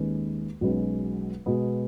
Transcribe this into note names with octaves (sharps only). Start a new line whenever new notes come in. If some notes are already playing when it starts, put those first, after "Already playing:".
Already playing: D#2 D#3 G#3 C#4 B4
B1 B2 G#3 C#4 B4
B2 G#3 B3